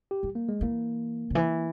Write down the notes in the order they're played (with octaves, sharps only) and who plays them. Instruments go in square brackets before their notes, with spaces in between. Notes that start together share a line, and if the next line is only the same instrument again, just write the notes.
[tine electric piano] G4
[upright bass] G3
[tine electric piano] A#3
G#3
[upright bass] E3 [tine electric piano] A#3
[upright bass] C#3
E3